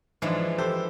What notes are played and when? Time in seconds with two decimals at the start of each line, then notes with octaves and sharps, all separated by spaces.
0.22 G#2 E3 F3 G#3 D4
0.58 G4 A4 C5